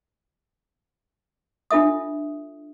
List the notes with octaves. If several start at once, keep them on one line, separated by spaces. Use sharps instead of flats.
D4 F4 A4 E5 D#6